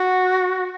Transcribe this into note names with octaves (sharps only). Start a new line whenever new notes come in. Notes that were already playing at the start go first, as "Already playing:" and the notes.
Already playing: F#4